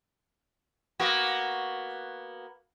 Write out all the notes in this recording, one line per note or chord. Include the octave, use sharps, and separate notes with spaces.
A#3 B3 F#4